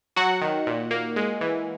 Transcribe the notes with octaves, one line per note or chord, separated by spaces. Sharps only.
F#3 F#4 F#5
D#3
A#2
A#3
G#3
E3